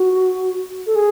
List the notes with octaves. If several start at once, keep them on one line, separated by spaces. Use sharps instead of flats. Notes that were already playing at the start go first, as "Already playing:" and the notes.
Already playing: F#4
A4
G#4